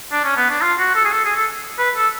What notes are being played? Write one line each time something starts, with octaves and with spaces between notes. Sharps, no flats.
D4
C#4
B3
D4
F4
F#4
A4
G#4
A4
G#4
A4
B4
A4